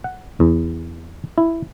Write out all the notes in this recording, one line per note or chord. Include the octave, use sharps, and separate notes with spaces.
F#5
E2
E4